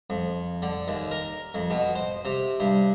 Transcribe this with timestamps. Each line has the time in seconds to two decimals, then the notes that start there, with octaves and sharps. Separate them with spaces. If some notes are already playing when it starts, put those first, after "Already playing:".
0.10 F2
0.62 D3
0.88 D#2
1.11 A#4
1.54 F2
1.70 B2
1.95 C5
2.25 C3
2.60 G2